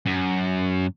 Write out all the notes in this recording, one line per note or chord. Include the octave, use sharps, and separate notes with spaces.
F#2